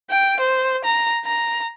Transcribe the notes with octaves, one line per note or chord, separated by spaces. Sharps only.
G5
C5
A#5
A#5